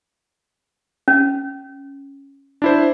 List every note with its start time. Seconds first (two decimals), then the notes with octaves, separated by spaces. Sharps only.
1.08 C#4
2.62 D4 E4 C5